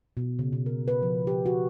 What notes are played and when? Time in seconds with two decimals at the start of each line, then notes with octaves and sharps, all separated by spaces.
0.17 B2
0.39 C#3
0.53 B2
0.66 A#4
0.88 B4
1.02 F3
1.27 G4
1.46 F#4